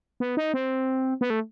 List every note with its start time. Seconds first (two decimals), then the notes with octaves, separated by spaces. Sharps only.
0.20 B3
0.37 D#4
0.54 C4
1.21 B3
1.30 A3